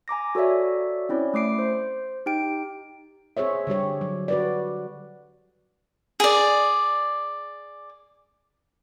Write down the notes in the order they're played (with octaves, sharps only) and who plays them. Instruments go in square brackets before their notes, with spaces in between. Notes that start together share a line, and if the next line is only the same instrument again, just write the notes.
[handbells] G#5 A#5 D6 A#6
F#4 A4 C#5 D5 E5
C4 C#4 E4 C#5 D5
A3 D6 C7 D7
C5
D#4 G4 G5 D7
[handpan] C4 G#4 C5 C#5 E5
D3 G3 G4 C#5
F#3
F#4 B4 D5
[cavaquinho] G#4 D5